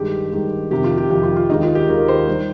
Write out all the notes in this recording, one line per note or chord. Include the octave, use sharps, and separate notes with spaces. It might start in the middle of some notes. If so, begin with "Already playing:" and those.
Already playing: G2 D#3 G#3 G4
G2 D#3 G#3
F2 C3 D#3 G4
F4
G4
F2 C3 D#3 G4
F4
F4
D#2 D#3 G#3 D#4
F4
G4
D#2 D#3 G#3 A#4
C5
D#3 G3